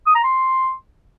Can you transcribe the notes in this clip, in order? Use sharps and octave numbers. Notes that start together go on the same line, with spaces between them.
D#6
A#5
C6